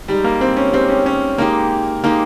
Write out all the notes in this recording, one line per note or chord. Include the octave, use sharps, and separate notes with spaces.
G3 G#3 D#4 G4
A#3
C4
C#4
G#3 C4 D#4 G4
C#4
C#4
G#3 A#3 D#4 G4
G#3 A#3 D#4 G4